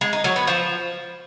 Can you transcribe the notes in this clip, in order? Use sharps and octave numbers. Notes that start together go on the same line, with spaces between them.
G#3
D#4
F#3
B3
F3